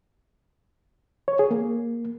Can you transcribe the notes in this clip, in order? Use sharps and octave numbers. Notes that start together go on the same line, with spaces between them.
C#5
G#4
A#3